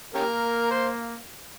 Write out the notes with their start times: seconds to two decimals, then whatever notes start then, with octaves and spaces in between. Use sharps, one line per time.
0.15 A#3 C#4 G4 A#4
0.71 C5